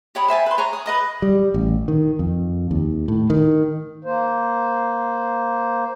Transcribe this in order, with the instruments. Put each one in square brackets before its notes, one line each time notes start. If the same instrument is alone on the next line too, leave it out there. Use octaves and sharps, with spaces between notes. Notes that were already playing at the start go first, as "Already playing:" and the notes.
[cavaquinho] G4 C#5 B5 D#6
C5 E5 G#5 A5
B4 C6
C#5 G#5 A#5 C#6
D#6
B4 D#5 D#6
[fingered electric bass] G3
A1
D#3
F2
D#2
A2
D#3
[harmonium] A#3 C5